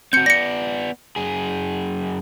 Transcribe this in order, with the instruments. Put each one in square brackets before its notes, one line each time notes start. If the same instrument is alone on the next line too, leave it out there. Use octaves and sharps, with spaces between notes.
[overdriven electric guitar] C4 F#4 [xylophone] G6 C#7
[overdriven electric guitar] B3 D5 [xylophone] A#6 C#7
[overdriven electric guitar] F#2 G#4